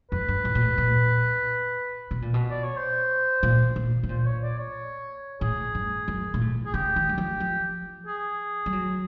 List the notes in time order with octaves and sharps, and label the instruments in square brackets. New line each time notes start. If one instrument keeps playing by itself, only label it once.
[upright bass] F2 [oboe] B4
[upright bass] G2
A2
A#2
A2
A#2
B2
A#2
B2
[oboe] D5
C#5
C5
[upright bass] A#2
A#2
B2
[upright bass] A#2 [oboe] C5
[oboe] C#5
D5
C#5
[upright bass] A2 [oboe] G#4
[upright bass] G2
F#2
A#2
A2
[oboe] G#4
[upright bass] C#3 [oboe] G4
[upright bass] D#3
F#3
F3
F3
[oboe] G#4
[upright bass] G3
F#3